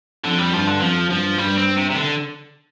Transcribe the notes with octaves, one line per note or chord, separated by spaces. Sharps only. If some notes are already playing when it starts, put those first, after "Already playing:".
F2 D3
G3
G2 F3
D3
F2 F3
G2 F3
G2 G3
C4
C3
C3
D3